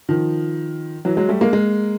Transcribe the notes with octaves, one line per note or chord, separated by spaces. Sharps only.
D#3 F3
E3 F#3
F#3 G#3
G3 A3
G#3 A#3
G#3 A#3